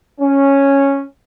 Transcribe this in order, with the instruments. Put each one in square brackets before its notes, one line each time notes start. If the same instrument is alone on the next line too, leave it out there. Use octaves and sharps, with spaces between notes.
[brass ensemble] C#4